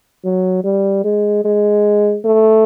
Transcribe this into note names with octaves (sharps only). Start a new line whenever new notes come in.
F#3
G3
G#3
G#3
A3